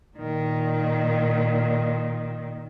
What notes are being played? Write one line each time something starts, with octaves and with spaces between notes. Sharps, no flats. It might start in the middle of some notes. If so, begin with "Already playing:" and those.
A#2 D#3